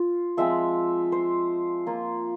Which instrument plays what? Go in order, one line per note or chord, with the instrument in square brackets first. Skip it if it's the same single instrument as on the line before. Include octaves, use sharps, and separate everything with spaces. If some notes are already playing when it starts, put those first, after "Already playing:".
Already playing: [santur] F4
F3 G#3 C4 E5
C5
A#3 F4